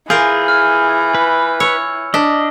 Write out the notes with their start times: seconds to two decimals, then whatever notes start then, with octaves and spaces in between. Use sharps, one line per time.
0.10 E3 F4 G#4 A#4 G6
0.48 F6
1.14 B4
1.60 C#5 E6
2.14 D4 D#5 B6